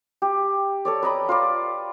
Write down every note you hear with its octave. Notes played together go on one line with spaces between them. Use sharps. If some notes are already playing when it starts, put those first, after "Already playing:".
G4
A4 C#5 D5
B4 D#5 A#5 B5
F4 B4 D5